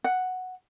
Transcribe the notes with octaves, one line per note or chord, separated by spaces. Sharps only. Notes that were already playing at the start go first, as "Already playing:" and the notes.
F#5